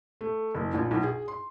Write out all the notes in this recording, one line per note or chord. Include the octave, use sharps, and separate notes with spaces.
A3
F#1
A#1
B1
G#4
C6